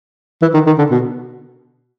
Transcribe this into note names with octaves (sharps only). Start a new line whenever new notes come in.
E3
D#3
D#3
D3
B2